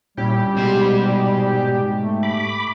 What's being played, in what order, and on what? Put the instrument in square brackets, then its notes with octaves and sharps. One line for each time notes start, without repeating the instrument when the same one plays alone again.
[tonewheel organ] A#2 C#4 E4 [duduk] G3 [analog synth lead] G4
[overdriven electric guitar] G#2 C5 [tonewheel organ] B2
[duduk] A3
[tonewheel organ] B5 D6